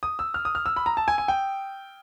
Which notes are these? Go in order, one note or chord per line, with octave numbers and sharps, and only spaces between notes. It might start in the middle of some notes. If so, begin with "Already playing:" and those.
D#6
E6
F6
D#6
F6
E6
B5
A#5
A5
G#5
G#5
G5